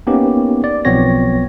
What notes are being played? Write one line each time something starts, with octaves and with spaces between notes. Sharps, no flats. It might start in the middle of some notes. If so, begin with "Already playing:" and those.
A#3 B3 C#4 D#4 G4
D5
B1 F3 B3 C4 C#5 A#6